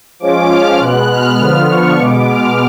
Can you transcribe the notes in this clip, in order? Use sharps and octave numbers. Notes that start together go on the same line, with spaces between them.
F3 G#3 C#4 F4 D6
F6
B2 G#3 B3 F#6
F6
D3 F3 B3 F4
C#6
B2 G#3 B3 D6
F6